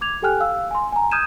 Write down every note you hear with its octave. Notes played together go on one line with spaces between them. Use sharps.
D6 G#6 F7
G4 A4 G5 G#5 F6 F#6
F5 E6
G#5 C6
G#5 A#5
D#6 F6 G6 G#6 D#7 E7